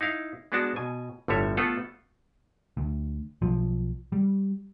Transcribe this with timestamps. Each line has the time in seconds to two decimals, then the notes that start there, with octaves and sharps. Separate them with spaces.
0.01 D#4 E4 F5
0.52 G#3 B3 D4 F#4 A5
0.76 B2 G#5
1.28 G1 A2 D3 G3 C#5 E5
1.57 A3 B3 F4 A4 F#5 A5
2.77 D2
3.42 B1 F3
4.12 G3